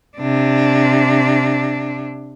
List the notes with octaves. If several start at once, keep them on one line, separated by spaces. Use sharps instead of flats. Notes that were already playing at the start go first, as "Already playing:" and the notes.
C3 D4